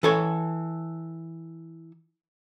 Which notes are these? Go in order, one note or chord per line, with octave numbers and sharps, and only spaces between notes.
E3 A4 C#5